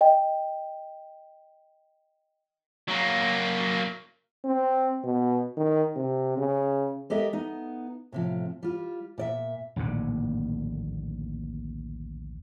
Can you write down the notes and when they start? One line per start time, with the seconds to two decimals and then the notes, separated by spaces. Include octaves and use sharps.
0.01 D#5 G5
2.88 F#3 A#3
4.45 C4
5.04 B2
5.57 D#3
5.96 C3
6.37 C#3
7.10 G#3 G4 A4 A#4 D#5 E5
7.33 B3 D#4
8.12 A2 C3 F3
8.63 G3 F4
9.18 A#2 D5 E5
9.76 A#1 D#2 A2 D3